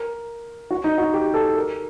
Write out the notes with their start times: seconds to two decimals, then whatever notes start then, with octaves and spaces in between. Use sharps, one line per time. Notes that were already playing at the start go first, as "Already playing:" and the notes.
Already playing: A#4
0.71 F#4
0.84 D#4
0.98 F#4
1.14 G4
1.34 A4
1.56 A#4